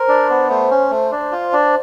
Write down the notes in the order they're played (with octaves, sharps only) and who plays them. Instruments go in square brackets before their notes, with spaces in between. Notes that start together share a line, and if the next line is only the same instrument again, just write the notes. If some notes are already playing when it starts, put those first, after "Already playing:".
Already playing: [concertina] A#4 [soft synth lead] C5
[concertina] D4
B3
[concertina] A3 [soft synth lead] C5
[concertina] C#4
A3
D4
F4
D4